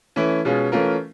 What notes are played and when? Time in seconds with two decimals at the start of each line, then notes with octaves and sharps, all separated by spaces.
0.16 E3 A3 C#4 E4
0.45 B2 G#3 C#4 F4 G#4
0.72 E3 A3 C#4 F4 A#4